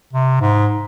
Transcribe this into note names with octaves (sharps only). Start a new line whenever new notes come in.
C3
G#2